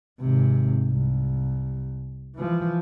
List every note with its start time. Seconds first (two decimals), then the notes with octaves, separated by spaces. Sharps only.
0.20 G#1 C3
0.85 C2
2.36 E3 F3